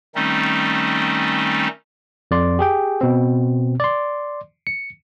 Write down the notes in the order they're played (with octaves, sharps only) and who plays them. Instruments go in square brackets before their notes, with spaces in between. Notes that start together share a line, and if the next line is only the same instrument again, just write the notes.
[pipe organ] D#3 G3 A3 C4 C#4 D#4
[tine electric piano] F2 D5 C6
G4 G#4 G5
B2 C4
D5 C6
C#7